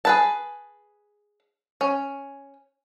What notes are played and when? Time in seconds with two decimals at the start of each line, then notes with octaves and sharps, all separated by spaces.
0.05 G#4 B4 A5
1.81 C#4